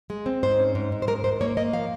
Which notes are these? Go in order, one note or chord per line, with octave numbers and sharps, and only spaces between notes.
G#3
C4
G#2 C5
C#4
G#2
G#2
C5
G#2 A#4
G#2 C5
A#3 C#5
A#3 D#5
F3 F5